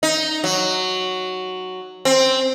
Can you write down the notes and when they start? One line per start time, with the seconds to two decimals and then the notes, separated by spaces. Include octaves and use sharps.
0.03 D#4
0.44 F#3
2.05 C4